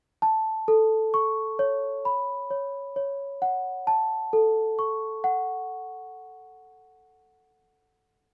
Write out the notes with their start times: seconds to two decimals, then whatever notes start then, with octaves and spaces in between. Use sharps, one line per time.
0.22 A5
0.68 A4
1.14 C#6
1.59 C#5
2.05 B5
2.51 C#5
2.96 C#5
3.42 F#5
3.87 A5
4.33 A4
4.79 C#6
5.24 F#5